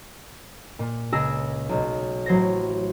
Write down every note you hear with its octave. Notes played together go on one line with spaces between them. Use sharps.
A#2
C#2 G#4 E6 A#6
B1
A1 F#3 C5 G#6 A#6